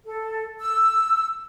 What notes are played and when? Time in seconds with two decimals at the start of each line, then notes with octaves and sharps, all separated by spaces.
0.06 A4
0.60 E6